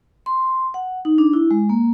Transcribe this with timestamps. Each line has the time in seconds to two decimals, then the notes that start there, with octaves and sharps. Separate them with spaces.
0.26 C6
0.74 F#5
1.05 D#4
1.18 D4
1.33 E4
1.51 G#3
1.69 A#3